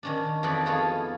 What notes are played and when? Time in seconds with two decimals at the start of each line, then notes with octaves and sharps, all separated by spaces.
0.03 D#3 C#4 D4
0.43 F2 E3 D#4 F#4 B4 D5
0.66 B3 D#4 F4 G#4 A4 C#5